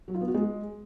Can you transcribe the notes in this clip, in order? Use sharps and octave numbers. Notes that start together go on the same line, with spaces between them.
F#3
F4
B3
F#4
G#3